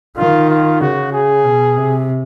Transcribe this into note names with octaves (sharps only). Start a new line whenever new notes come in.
D#3 F4
F4
C#3 F#4
G#4
B2
C3